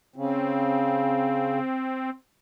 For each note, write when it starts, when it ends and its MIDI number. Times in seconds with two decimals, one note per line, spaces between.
0.16 1.59 49
0.16 2.10 60